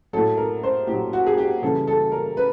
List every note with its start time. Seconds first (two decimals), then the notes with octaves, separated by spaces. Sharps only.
0.13 A2 F#3 A4
0.37 A#4
0.63 C5
0.87 A2 G4
0.92 F#3
1.13 F#4
1.27 G#4
1.38 G4
1.62 C#3 E3 G3 A4
1.87 A4
2.12 A#4
2.37 B4